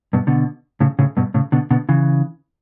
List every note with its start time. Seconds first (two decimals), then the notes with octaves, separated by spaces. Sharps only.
0.13 G2 B2
0.27 B2 D3
0.80 A2 C#3
0.99 A2 C#3
1.17 G2 B2
1.34 A2 C#3
1.52 B2 D3
1.71 B2 D3
1.89 C#3 E3